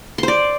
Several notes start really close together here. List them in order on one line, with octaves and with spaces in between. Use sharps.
C6 C5 D5